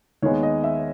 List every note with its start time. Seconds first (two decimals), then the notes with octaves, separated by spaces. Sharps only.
0.22 D#2 D#3 G#3 B3 C#5
0.43 D#5
0.64 E5